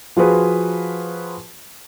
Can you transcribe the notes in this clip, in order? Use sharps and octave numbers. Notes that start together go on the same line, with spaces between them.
F3 F4 F#4 G#4 B4 C5